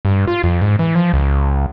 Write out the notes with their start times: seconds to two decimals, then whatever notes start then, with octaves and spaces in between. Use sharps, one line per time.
0.05 G2
0.27 F4
0.44 F2
0.62 G#2
0.79 E3
0.95 F3
1.13 C#2